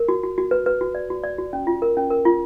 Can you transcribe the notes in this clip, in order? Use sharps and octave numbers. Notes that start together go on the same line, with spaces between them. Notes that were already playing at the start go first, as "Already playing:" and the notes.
Already playing: A#4
F#4
F#4
F#4
B4
B4
F#4
D5
F#4
D5
F#4
C#4
F4
A#4
C#4
A#4
F4